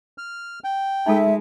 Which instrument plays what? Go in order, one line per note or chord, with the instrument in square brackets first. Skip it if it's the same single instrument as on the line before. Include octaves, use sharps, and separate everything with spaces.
[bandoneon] F6
G5
[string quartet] G#3 [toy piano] D#4 F4 A4 [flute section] E5